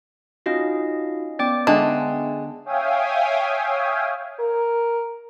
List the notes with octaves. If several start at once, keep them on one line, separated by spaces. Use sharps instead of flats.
C#4 D#4 F4 F#4 D#5 F5
B3 C#4 D5 G5 D6
D3 G#3 B3 E5 G5 A5
C#5 E5 F5 G5 G#5 D#6
A#4